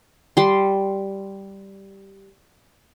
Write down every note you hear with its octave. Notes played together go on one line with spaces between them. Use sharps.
G3 C6